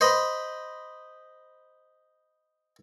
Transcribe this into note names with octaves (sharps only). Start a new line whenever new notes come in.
C5 D#5 B5